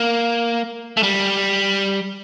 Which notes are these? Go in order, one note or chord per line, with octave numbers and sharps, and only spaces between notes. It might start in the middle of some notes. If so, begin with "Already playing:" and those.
Already playing: A#3
A3
G3